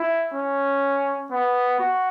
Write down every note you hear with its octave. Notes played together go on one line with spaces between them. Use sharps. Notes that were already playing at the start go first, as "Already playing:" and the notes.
Already playing: E4
C#4
B3
F#4